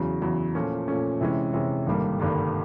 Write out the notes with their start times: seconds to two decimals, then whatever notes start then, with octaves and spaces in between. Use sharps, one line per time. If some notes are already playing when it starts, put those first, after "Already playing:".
Already playing: E2 C#3 F#3
0.22 E2 C#3 F#3
0.55 A#2 F3 A3 C#4
0.88 A#2 F3 A3 C#4
1.21 C3 E3 G#3 C#4
1.54 C3 E3 G#3 C#4
1.87 G#1 G2 D3 G3 A#3
2.20 G#1 G2 D3 G3 A#3